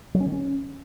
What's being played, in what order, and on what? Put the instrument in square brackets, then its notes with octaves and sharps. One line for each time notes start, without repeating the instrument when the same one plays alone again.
[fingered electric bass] F#3
C#4
D#3
C#4